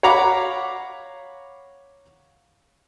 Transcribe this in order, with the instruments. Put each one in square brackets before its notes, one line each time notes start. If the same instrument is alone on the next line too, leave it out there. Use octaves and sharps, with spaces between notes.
[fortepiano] C#5 F5 F#5 A#5 B5 D6